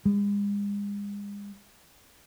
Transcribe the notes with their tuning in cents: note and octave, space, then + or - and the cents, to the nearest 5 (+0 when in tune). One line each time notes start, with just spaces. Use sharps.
G#3 -40